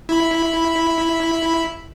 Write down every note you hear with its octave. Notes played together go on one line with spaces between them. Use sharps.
E4 B5